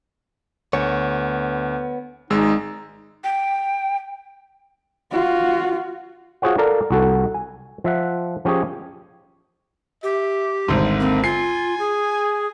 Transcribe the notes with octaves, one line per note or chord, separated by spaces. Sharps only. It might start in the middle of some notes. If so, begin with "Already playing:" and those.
D2 B3 C#5
G#1 G#3 D#4 E6
G5
F4 F#4
F4 F#4 G#4 C5 C#5 F#5
A4 A#4 D5 F5 A#5
C2 F#4 A4
G#5
F3 E5 F#5
F3 C#4 G4 G#4 C#5
G4 E5
G#1 D2 G#2 G3
A#3 C4
F4 G#5 C7
G#4